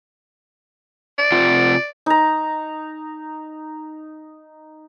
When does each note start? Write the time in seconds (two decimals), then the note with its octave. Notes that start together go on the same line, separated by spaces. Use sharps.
1.18 D5
1.32 C3 F4 F#5
2.06 D#4 A#5